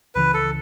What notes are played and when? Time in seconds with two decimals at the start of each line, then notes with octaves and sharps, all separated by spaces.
0.15 C#2 C#3 E3 B4
0.34 A4